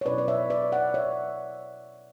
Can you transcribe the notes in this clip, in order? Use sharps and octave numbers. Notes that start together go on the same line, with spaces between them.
C#5
B2 F#3 C#4 E4 B4 D5
D5
C#5 E5
B4 D5
D5 F#5
C#5 E5